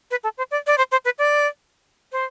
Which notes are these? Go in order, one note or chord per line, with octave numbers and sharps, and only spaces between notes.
B4
A4
C5
D5
D5
C5
C5
B4
D5
C5